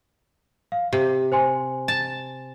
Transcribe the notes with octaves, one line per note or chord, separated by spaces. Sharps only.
F5
C3 G4
C5 G#5 C6
A5